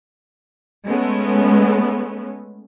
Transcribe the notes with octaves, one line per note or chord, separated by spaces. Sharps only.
G#3 A3 B3 C#4